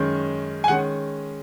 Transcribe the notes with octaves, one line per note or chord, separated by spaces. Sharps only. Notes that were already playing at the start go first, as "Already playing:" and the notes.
Already playing: F#2 D#3 G#3 C#4
G#5
D#3 G#3 C#4 F#5